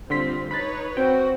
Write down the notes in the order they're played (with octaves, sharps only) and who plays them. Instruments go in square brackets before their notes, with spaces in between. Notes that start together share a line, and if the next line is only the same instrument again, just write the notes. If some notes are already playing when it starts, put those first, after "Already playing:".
[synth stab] D3 C6 B6 [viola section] G3 C4 F4
[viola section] D#4 B4 C#5 [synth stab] B5 F#6 A6
[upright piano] C4 [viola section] F#4 [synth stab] G5